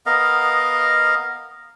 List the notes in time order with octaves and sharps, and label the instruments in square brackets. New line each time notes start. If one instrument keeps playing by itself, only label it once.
[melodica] B3 A#4 D#5 F5